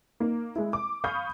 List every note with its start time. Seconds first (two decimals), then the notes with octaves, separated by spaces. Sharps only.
0.20 A#3 D#4
0.56 G#3 E4
0.73 D6
1.04 F5 B5 C#6 D#6 G6